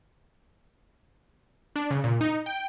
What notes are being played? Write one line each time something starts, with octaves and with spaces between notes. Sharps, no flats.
D4
C#3
A#2
D#4
G5